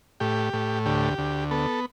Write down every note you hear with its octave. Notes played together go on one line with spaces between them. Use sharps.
A2 G4
A2
D2 G4
D2
B3 A4